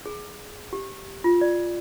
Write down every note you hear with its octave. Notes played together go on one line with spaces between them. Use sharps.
G#4
G4
F4
D5